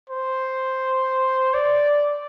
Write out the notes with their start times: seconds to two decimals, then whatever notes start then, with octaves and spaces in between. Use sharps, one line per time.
0.10 C5
1.54 D5